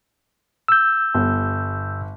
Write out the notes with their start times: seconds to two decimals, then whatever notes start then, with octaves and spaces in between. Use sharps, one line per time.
0.68 E6 G6
1.14 G1